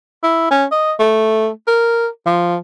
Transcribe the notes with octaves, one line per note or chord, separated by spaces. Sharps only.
E4
C#4
D#5
A3
A#4
F3